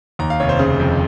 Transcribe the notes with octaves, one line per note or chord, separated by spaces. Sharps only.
D#2 A#5
F5
F1 C#5
C5
C#3
F2